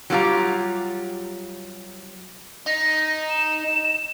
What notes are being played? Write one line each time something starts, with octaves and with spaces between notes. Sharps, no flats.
F#3 G3 A#3 F4 G4 A#5
D#4 A#6
E7